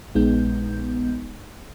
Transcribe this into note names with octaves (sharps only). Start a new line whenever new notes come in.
A#1 G#3 B3 D#4 G6